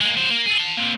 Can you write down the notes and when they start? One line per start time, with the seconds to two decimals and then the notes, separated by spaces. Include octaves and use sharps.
0.01 G#3 A#3
0.17 F#3 C5
0.31 A#3
0.46 G#4 A4
0.58 A5 C6
0.77 A#3 C4